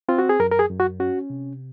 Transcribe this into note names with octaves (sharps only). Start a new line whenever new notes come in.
C4 F4
F#4
G#4
F#2 A#4
A#4
G#4
F#2
F#4
C#4 F#4
C3